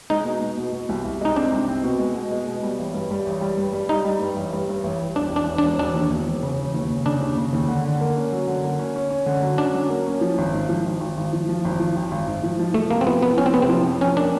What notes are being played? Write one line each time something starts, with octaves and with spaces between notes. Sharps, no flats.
G#3 D#4
B2
B2
B2
B2
C2
C2
G#3 D#4
C4 D4
C2
C4
B2
G#3
B2
G#3
B2
G3
A1
G2
G3
A1
G3
G2
G3
G3 D#4
G3
G2
A1
G2
G2
A1
A1
E1 D4
E1 D4
E1
D4
E1
E1 D4
D#2
E1
E1
C#3
E1
D#2
C#3
C#3 D4
D#2
C#3
D#2
D3
D3
A#3
C#4
F#3
D3
A#3
C#4
C#4
C#4
D3
F#3
C#4 D4
F#3
A#3
C#4
F3
G#1
G#2
F3
G#1
G#1
G#1
F3
F3
G#1
F3
G#1
G#1
G#2
F3
F3
F3 A3
C3 A#3
C4
F3 B3
F3 B3
F3 C#4
C4
C3 B3
C4
F3
F2
F2 C#4
A#3 D4